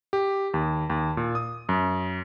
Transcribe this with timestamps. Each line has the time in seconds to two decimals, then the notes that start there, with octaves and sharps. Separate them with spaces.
0.13 G4
0.54 D#2
0.90 D#2
1.17 A#2
1.35 D#6
1.69 F#2